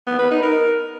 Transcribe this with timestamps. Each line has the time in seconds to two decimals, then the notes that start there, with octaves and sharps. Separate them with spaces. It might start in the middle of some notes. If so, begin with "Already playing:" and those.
0.07 B3
0.19 B4
0.31 D#4
0.43 A#4